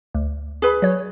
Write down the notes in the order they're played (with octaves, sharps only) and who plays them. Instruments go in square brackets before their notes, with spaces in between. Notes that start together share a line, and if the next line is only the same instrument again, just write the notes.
[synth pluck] D2
[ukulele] G#4 B4 B5
[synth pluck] F#3 C#5